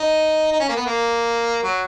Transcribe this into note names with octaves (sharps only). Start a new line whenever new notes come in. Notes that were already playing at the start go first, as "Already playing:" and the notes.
Already playing: D#4
D#4
C#4
A#3
B3
A#3
F#3